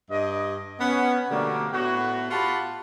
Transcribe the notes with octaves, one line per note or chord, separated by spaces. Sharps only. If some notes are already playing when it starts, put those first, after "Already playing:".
G2 D#5
B3 C#4
B2 D3 G3 A3 A#3
A2 B3 F#4
F4 G4 F#5 A5 B5